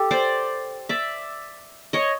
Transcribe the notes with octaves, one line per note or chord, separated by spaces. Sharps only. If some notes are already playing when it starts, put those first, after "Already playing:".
Already playing: G4 A4
C5 D5
D5 E5
C#5 D#5